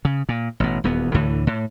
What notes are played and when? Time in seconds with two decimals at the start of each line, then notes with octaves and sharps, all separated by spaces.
0.05 C#3
0.29 A#2
0.60 A1 B2
0.84 D#1 E2 B3
1.14 D2 A2 D3 E3
1.47 A2